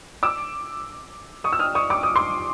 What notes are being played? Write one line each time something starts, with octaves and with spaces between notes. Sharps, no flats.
D6 E6
C#6 D#6
E6
D#6 F6
C#6 D#6
D6
D#6
C6 D6